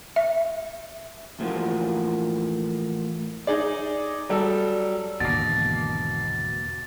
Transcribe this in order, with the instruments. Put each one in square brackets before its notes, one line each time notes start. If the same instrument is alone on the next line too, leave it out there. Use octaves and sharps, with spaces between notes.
[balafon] E5
[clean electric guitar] E2 A2 F3 A#3 F#4
[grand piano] D#4 G#4 D5
F#3 G3 A4 E6
[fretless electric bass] G#1 E2 D3 [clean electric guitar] B2 A#3 [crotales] A6